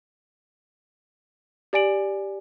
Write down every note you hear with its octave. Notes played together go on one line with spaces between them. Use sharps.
G4 D5 G#5 D7 F#7